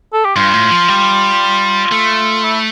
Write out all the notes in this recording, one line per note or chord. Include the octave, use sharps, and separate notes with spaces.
A4
G4
G2 F4
A2
F3
G3
A3
E4